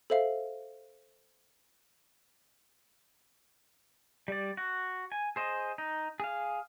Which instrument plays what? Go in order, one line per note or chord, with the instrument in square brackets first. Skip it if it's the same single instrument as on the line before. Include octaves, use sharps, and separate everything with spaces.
[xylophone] A4 C5 E5 F5
[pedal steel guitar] G3 D5
F#4
G#5
G#4 C5 D#5
D#4
G#4 F5